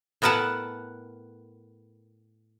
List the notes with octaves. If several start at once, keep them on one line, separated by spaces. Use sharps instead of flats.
A2 B3 A#4 B4 F#5 A5